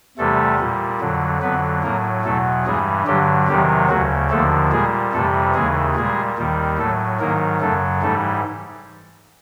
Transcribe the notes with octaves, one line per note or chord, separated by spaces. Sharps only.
E2 C3 E3 G3 A3 A4
A#2 G3
F2 D3 F#3
F2 D3 F#3 B3 B4
A2 F#3 A#3 A#4
E2 B2 F#3 A3 A4
G2 E3 G3 G#3 G#4
G2 D3 F#3 G3 G4
E2 C3 D#3 F#3 G3 G4
D2 C#3 F#3 F#4
D#2 D3 F3 A3 A4
A#2 G3 G#3 G#4
F2 C3 E3 G3 A3 A4
D#2 C#3 E3 G#3 G#4
A#2 G3 G#3 G#4
D#2 D#3 G3
A2 F#3 A3 A4
G#2 D#3 F#3 A#3 A#4
F#2 C#3 F#3 A3 A4
G#2 E3 G3 A3 A4